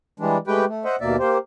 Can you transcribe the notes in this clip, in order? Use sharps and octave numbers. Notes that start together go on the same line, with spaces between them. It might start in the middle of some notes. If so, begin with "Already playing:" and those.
E3 G3 G#3 D4
G#3 A3 G4 B4 G5
A3
C5 D#5 E5 F#5
D#2 B2 A#3 D5 E5
A#3 G4 C5